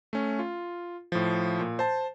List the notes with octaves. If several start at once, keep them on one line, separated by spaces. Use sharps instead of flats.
A3 C#4
F4
A2 F3
A#2
C5 A5